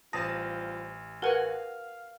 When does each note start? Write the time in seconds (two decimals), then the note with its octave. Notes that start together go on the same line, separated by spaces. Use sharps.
0.13 A1 G3 F4 C5 A5 D#6 A#6
1.22 F#4 A#4 B4 F5 F#5 G#5